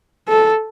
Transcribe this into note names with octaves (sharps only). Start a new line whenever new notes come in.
A4